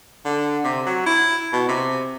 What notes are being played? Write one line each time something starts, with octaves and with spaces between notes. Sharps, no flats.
D3
C3
F#3
E4
B2
C3